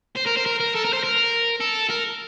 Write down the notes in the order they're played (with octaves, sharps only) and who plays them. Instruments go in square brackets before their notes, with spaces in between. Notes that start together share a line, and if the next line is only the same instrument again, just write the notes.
[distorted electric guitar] C5
A#4
C5
A#4
A#4
A4
A#4
C5
A#4
A4
A#4